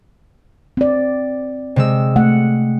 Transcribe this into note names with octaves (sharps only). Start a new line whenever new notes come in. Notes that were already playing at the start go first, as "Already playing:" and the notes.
C4 D5
C3 G#3 E6
A3 F#5